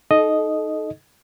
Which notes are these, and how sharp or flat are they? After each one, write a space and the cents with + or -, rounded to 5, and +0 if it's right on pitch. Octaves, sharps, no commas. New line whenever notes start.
D#4 +0 A4 -25 D#5 +0